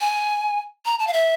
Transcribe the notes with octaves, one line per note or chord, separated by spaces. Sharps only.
G#5
A#5
A5
F5
E5